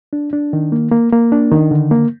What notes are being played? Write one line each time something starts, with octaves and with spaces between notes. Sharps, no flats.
D4
D4
D#3
A#3
A#3
A#3
D4
D#3
D3
A#3